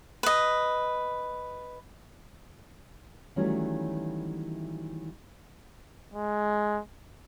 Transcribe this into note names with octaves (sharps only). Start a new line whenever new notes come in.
B4 D#5
D#3 E3 F#3 G3 A3 C#4
G#3